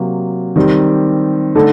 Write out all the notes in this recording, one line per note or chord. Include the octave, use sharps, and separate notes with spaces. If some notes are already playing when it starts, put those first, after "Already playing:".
Already playing: C3 F#3 A#3
D#3 G3 C4 G4
D3 A3 D#4 A4